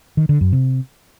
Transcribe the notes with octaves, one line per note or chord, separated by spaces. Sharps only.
D#3
D3
F#2
C3